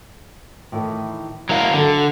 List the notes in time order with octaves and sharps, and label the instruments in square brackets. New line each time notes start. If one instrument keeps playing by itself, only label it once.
[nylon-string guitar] A2 D#3 E3
[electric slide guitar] F#3 A#4 F5 [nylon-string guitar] G#3 E4
[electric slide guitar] D3 [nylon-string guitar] F#4 A4